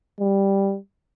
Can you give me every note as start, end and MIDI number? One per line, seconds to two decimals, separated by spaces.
0.20 0.77 55